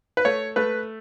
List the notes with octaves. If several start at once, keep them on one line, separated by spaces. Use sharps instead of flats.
B4
A3 C#5
A3 B4